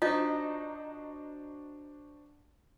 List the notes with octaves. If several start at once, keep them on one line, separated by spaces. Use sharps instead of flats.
D4 D#4 F4 F#4 C5 D#5